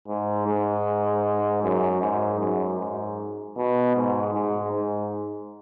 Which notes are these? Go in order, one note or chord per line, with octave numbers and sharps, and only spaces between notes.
G#2
G#2
F#2
G#2
F#2
G#2
B2
G#2
G#2
G#2